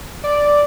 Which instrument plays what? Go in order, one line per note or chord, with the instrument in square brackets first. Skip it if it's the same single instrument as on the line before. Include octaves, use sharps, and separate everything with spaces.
[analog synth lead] D5